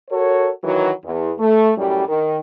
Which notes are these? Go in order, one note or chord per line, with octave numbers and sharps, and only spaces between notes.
F#4 A4 A#4 C#5
D#3 E3 F#3
E2
A3
F#2 A2 G3
D#3